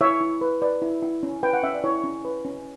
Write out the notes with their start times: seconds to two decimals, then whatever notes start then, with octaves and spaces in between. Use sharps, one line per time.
0.01 E4 C#5 E5
0.21 E4
0.41 B4
0.62 B4 D5
0.82 E4
1.02 E4
1.23 C#4
1.43 B4 G5
1.53 F#5
1.63 C#4 E5
1.74 D5
1.84 E4 C#5
2.04 C#4
2.25 B4
2.45 C#4